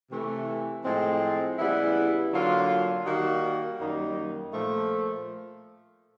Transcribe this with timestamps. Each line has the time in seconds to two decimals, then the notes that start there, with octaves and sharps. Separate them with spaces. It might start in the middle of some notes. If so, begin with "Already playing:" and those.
0.11 C3 E3 A3
0.84 A2 F3 G#3 C4
1.58 C#3 E3 G3 B3 E4
2.32 D3 F#3 A#3 D4 F4
3.05 D#3 G3 A#3 D#4 F#4
3.79 F#2 D#3 G3 A#3 D#4
4.53 A#2 F3 A3